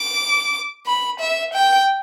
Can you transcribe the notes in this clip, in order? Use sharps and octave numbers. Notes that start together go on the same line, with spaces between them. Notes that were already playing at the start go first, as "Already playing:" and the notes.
Already playing: D6
B5
E5
G5